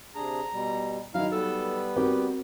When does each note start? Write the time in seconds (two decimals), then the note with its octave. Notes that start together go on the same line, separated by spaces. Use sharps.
0.15 C3 D4 G#4 A#5
0.52 B2 G3
1.14 D#3 F#3 D#4 E4 F5 A#5
1.32 G3 B3 A4 B4
1.96 C4 F#4 G4 A#4